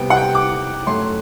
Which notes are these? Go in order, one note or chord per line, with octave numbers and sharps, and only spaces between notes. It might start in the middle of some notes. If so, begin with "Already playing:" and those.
Already playing: C3 G3 B3 G5
F#5
G5
D6
F#2 F#3 A3 C6